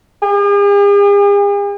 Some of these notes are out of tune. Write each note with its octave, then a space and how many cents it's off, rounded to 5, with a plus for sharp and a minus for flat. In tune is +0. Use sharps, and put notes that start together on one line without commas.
G#4 -45